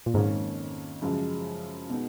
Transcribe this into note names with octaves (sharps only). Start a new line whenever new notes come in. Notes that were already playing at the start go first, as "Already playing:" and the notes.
A#2
F2 G#2 D#3 A#3 C#4
F#2 C#3 F3 G#3
B2 G#3 B3 D#4